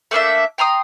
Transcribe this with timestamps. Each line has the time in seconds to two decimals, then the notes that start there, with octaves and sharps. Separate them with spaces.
0.11 A3 A#3 D4 E5
0.58 G5 A#5 C6 D#6